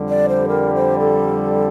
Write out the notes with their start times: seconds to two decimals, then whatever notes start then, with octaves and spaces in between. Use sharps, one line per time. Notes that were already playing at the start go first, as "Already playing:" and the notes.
Already playing: F2 D3 G3
0.09 D5
0.29 C5
0.49 A#4
0.75 C5
1.00 A4